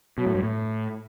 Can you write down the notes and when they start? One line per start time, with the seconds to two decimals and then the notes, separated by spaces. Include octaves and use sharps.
0.18 B2 F#3
0.27 A2
0.35 G2
0.43 A2